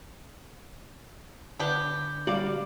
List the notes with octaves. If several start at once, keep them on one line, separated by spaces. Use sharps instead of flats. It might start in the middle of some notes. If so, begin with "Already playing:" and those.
D3 B3 D4 G4
G3 F#4 D5 F5